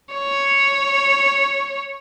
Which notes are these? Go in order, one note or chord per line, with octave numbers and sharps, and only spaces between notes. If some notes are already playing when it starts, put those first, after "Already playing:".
C#5